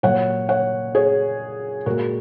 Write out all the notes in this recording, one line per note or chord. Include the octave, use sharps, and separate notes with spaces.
A#2 F#3 C#5 F#5
C#5 F#5
G#4 C#5
A#2 G#3 F#4 A#4